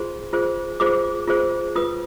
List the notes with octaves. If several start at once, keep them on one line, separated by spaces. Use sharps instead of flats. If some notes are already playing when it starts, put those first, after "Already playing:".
Already playing: F4 G#4 C5 C6
F4 G#4 C5
F4 G#4 C5 D6
F4 G#4 C5
F4 B4 D#6